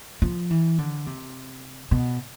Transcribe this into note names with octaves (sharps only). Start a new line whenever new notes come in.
F3
E3
D3
C3
B2